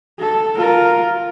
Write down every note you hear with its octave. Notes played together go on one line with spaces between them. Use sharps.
A4
F4 A#4